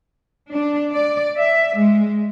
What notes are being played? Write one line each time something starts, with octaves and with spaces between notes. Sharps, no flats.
D4
D5
E5
G#3